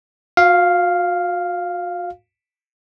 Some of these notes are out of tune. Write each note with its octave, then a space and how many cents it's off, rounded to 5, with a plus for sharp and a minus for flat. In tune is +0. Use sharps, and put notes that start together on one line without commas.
F#4 -40 F5 +0